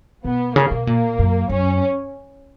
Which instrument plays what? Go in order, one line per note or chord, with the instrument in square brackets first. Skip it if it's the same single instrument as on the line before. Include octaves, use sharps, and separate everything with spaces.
[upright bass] B2 [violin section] B3
[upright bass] C#3 [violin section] A#3
[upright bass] B2
[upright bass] A#2 [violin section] A#3
[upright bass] F#2
[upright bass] F#2 [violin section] C#4